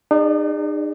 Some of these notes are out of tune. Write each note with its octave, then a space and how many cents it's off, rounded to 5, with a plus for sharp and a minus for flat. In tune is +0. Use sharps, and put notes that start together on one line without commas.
D#4 -40 G#4 -30 D5 +0